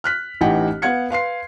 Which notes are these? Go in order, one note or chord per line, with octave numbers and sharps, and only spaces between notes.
F6 F#6 B6
A1 E3 D#4 G4 F#5 G5
B3 F5 F#5 G#6 C#7
B4 F5 C6 C7